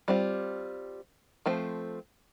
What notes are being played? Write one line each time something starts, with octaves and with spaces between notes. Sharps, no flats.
G3 C4 F4
F3 A3 C4